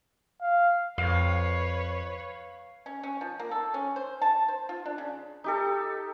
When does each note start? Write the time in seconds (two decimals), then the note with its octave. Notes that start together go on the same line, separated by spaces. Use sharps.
0.42 F5
0.98 F2 B4 C#5 F5
2.86 C#4
3.03 C#4
3.21 F3
3.40 A#3
3.51 A4
3.74 C#4
3.96 C5
4.22 A5
4.48 C5
4.69 F4
4.86 D4
4.98 C#3
5.44 D#4 G4 A4